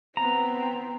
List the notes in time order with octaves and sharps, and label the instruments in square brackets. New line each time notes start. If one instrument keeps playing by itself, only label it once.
[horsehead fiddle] B3 C4 [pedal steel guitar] A#5